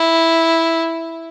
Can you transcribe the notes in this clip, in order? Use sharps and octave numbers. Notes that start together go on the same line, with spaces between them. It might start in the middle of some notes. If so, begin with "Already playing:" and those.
Already playing: E4